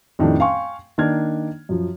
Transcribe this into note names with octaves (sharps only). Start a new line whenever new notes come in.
F2 A2 D#3 G3 A3 D4
F5 G5 G#5 C6 C#6
D#3 A#3 D4 F6 G#6
F#2 F3